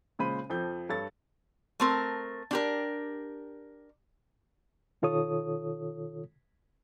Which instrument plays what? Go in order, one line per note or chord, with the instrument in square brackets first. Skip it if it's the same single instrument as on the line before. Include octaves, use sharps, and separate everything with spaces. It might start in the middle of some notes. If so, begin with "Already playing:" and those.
[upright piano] A#2 C#3 G#3 C5 B5 D#7
F2 F3 A4 G6
G2 A4 C#5 A6
[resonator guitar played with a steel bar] A3 C4 A#4
D4 G4 A#4
[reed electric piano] B2 D#3 F4 A4 C#5 D#6